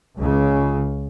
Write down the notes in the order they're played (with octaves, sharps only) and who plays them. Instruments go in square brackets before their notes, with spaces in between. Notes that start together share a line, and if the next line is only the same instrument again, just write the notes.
[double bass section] C#2 C#3